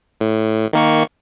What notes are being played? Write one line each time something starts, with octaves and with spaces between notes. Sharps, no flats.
A2
D#3 A#3 C#6